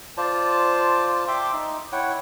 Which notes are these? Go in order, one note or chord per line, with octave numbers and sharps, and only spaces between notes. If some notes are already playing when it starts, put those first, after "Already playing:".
F4 C5 D5 A5
E5 G5 C6 D6
D#4
E4 C#5 F#5 G5